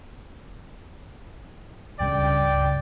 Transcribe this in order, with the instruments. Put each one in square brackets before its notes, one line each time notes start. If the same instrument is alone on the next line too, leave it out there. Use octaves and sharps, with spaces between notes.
[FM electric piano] C#2 G2 C#3 [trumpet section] D5 G5